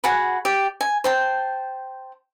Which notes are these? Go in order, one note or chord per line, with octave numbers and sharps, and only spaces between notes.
F#4 G#4 F#5 B5
G4 D5
G#5
C5 G5 A5